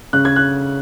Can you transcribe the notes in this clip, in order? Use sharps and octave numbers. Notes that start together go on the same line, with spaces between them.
C#3 F#6
G#6
F#6